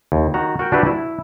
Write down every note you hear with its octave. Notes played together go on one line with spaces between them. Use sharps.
D#2
D#3 F#4 A#5
F#4 A#4 G5
D4 F#4 G4 B4 E5
E4